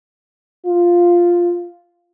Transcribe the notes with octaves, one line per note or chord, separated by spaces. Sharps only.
F4